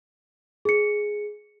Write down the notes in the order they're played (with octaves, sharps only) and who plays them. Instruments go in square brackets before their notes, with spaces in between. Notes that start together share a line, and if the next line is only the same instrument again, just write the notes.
[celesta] G#4 C#7